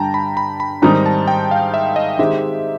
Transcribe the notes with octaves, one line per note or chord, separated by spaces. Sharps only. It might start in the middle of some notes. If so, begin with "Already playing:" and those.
Already playing: G2 D3 G3 G5 A5 A#5
B5
B5
B5
G#2 D#3 G3 C4 D#4 A#5
A5
G5
F5
E5
D#5
D#3 G#3 C4 D#4 G4 E5